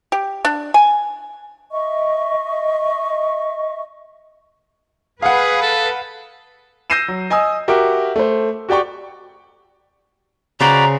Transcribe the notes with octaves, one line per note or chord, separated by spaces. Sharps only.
G4
D4
G#5
D#5 E5 C#6
G#4 B4 F5 F#5
A4
E6 G6 A#6 C7 D#7 E7
F#3
D#5 G#5 D#6 E6
F#4 G4 A#4 E5 D6
A3 C5
F#4 G4 D5 G5 C#6
C#3 F#4 C5 D5 A#5 B5